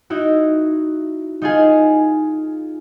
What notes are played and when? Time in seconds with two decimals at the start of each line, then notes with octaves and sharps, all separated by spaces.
0.10 D#4 E4 F#4
1.42 D#4 F4 G#4